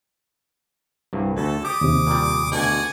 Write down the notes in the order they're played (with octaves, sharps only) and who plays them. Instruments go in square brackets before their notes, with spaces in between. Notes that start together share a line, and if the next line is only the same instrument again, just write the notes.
[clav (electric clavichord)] C2 G2
[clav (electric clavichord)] D2 [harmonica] A4
[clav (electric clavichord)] G4 [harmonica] D6 D#6
[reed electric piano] D#2 C3
[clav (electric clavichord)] A#2 G3
[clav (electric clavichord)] D2 B2 [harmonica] D5 F#5 G#5